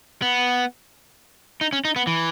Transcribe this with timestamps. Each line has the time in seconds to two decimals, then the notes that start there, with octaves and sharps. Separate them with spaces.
0.22 B3
1.61 D#4
1.73 C#4
1.85 D#4
1.96 B3
2.07 E3